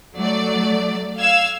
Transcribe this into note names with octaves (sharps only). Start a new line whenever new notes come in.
F#3 A3 D5
F5 E6 G#6